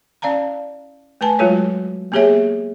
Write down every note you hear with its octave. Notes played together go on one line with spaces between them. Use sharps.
C#4 D5 F5 A5 A#5
A3 B4 G#5 A5
F#3 G#3 F4 F#4 A4 C#5
A#3 B3 G4 G#4 C#5 E5